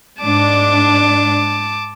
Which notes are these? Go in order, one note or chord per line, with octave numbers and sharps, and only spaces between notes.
G#2 D4 A5 D6